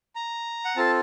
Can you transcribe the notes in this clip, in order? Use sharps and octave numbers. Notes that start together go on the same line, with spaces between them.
A#5
F#5
C4 F4 A4 A5